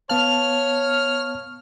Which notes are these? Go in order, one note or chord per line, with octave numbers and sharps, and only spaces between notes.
B3 C#5 F5 A5 F6